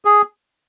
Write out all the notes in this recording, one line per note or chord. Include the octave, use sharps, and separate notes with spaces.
G#4